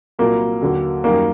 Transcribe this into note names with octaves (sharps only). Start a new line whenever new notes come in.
C2 A#2 F#3 A#3
D#2 D3 F#3
F#2 D#3 G3 A#3